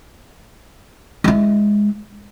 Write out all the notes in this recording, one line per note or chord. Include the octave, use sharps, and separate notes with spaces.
G#3 E4